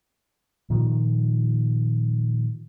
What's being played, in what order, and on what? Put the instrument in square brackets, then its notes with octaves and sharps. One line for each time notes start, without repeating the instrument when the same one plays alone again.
[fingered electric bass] A#2 D#3 F3